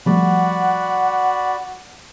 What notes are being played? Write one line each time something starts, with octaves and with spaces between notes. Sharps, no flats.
F3 G3 A3 F#4 D5 F#5 B5